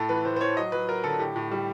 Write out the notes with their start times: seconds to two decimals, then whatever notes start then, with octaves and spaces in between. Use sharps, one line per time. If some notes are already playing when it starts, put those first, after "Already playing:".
Already playing: A2 A4
0.09 E3 B4
0.25 A2 C5
0.36 C5
0.41 E3 C#5
0.57 F#3 D#5
0.72 F#3 B4
0.88 F#3 A#4
1.04 D3 A4
1.20 A2 G4
1.36 A2
1.51 G3